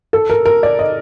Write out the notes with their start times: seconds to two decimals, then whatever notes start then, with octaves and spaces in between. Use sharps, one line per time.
0.13 A4
0.30 A#4
0.46 A#4
0.63 D5
0.79 D#5